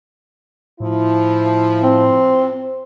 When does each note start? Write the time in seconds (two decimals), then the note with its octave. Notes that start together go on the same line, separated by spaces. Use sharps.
0.80 A2 F3 E4
1.83 C4